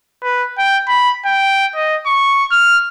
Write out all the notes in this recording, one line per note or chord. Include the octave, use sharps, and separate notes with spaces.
B4
G5
B5
G5
D#5
C#6
F6